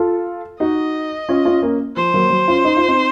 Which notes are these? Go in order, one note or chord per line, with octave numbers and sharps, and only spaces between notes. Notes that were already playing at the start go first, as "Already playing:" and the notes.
Already playing: F4 A4
D#4 F#4 D#5
C#4 F4
C#4 F4
A#3 C#4
F3 C5
F#3 A#3
F#3
C#4 F4
D#4
F4
C4 D#4